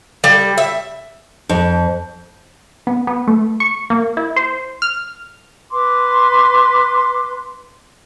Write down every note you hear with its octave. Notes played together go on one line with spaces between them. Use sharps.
G3
E5
F2
B3
B3
A3
C#6
A#3
E4
C5
F6
B4 C6 D6